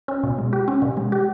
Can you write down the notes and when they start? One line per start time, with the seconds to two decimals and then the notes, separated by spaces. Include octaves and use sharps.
0.08 C#4
0.23 B2
0.38 G#3
0.53 G4
0.68 C#4
0.82 B2
0.97 G#3
1.12 G4